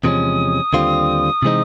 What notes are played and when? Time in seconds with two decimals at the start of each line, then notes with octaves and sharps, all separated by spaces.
0.04 E2 C3 F3 G#3 C#4 D#6
0.73 D#2 D3 G3 C4 F4
1.42 C3 E3 G#3 C4 D#4